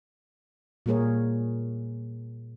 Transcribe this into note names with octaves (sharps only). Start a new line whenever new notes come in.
A#2 G3 A#3 G#4 A#4 C#5